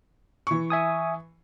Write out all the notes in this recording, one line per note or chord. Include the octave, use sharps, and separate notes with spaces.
E3 C#6
E5 G#5 D#6